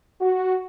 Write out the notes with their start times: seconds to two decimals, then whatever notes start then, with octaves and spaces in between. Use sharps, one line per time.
0.21 F#4